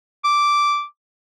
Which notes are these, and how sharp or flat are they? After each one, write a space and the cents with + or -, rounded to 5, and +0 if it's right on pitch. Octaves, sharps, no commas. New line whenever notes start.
D6 -5